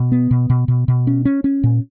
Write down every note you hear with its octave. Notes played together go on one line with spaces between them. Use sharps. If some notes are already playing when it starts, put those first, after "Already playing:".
Already playing: B2
B3
B2
B2
B2
B2
C#4
C#4
C#4
A#2